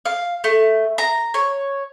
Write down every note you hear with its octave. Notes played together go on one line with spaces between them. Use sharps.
F5
A3
A#5
C#5